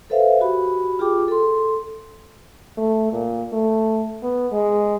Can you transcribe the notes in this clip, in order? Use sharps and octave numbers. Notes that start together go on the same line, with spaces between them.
A4 B4 C5 E5 F5
F#4 G4 B5
F4 G4 G#4 G5 D6
A4 C6
A3
A#2
A3
B3
G#3